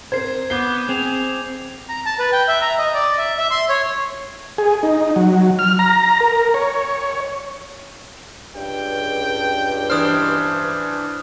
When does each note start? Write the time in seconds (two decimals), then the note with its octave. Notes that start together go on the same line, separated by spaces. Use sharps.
0.12 C4 A#4 C5 G#6 C7
0.50 B3 D6 G6 C7 G7
0.89 C4 G#4 G6 F7
1.89 A#5
2.06 A5
2.19 B4
2.32 G5
2.48 E5
2.62 A#5
2.78 D#5
2.94 D5
3.18 E5
3.38 E5
3.51 C6
3.69 C#5
4.58 G#4
4.83 D#4
5.16 F#3
5.59 F6
5.79 A#5
6.21 A#4
6.54 C#5
8.55 C#2 G2 G5
9.90 E3 D4 C5 D#6 F6